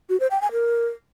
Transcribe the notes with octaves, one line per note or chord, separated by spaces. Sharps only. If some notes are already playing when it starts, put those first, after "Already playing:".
F#4
C5
G5
G#5
A#4